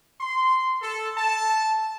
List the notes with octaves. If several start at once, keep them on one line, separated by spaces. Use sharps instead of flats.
C6
A4
A5